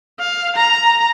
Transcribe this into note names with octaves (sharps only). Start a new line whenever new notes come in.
F5
A#5